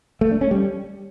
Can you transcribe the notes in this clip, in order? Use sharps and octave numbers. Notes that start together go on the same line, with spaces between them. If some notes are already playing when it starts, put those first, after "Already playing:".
A3
D4
C#4
G3